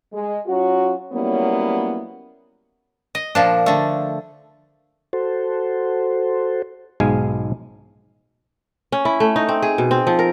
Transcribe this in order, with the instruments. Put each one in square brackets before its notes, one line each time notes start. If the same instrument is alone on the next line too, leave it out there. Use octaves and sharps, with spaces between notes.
[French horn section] G#3
F#3 C#4 F4 F#4
F#3 G3 A#3 B3 C#4 E4
[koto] D#5
A#2 F3 D4
D3 A3
[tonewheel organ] F#4 A4 C5
[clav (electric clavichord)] B1 G#2 G#3 F5 G#5
[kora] C#4
E4
A3
D#4
C4
G#4
B2
C4
F3
A#4